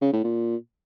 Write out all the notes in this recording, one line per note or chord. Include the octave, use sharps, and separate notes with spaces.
C#3
A2
A#2